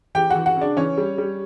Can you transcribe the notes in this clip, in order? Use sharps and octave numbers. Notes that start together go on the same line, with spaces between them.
E3 G4 G5
F#4 F#5
E3
F#4 F#5
C#3 D4 D5
E3 C#4 C#5
G3
G3